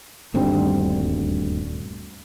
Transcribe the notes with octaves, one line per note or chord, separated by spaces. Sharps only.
D#1 D2 G2 C4